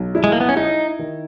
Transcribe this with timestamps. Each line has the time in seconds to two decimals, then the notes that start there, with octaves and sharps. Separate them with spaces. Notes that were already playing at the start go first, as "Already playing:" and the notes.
Already playing: B1
0.15 E4
0.24 G#3
0.32 A#3
0.40 B3
0.49 C#4
0.56 D#4 E4
0.99 D#3